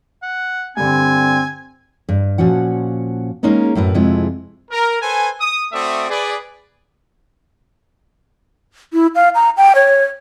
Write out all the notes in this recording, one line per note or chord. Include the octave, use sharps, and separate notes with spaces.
F#5
G2 D3 C4 G#5
G2
A#2 F3 C#4 F#4 F#5
G#3 A#3 C#4 D#4 G#4 A#4
F#2 A2 A#4 B4
F2 C3 G#3 E4 F4
A#4
A4 B4 C5 G#5
D#6
A3 C4 F#4 D5 E5 D#6
G#4 B4 D5
E4
F5
A#5
G5
C#5